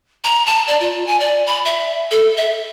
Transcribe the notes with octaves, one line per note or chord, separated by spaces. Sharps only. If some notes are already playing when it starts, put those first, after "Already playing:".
A#5
A5
D5
F4
G#5
D5
B5
E5
A4
E5